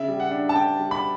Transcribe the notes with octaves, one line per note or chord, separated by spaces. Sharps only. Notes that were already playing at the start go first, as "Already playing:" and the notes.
Already playing: C#3 E5
G3
F#5
D4
A5
D4 G5
G3
B5